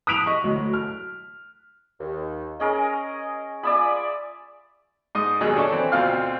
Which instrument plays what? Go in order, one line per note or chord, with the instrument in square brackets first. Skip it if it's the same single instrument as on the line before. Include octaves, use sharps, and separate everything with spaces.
[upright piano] D#6 F#6 B6 D7 F7 F#7
D#5 C#6
D2 F#3
F6
[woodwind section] D#2
[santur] C#4 G#4 A#4 [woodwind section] D#5
[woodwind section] F4 G#5 D#6 [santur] D5 E5 B5
[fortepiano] G#2 D#5 D#6
D#2 B2 F#3 D#4 G#4 F#6
D4 A4 C#5 E5
E3 C4
D2 B2 C4 F4 F5 F6